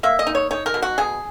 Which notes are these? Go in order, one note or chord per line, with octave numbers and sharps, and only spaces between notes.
A#3 E5
D#5
D#4
C#5
D#4 C#5
A#4
B2
F#4
B2 G#4